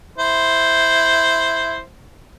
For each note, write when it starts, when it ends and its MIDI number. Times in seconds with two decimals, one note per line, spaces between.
0.18 1.80 64
0.18 1.80 72